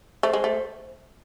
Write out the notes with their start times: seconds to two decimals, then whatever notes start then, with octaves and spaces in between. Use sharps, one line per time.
0.23 A3 C5
0.33 G#3
0.44 A3